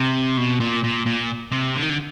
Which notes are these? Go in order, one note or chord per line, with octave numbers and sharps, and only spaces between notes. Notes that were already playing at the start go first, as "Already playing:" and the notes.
Already playing: C3
B2
A#2
A#2
A#2
C3
D3
D#3
D3